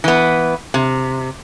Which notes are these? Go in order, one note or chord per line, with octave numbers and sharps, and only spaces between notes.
E3 B3
C3